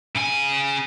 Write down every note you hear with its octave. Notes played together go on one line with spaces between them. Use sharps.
C#3 G#5